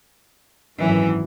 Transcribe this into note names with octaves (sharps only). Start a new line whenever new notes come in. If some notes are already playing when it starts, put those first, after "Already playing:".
G#1 F#2 E3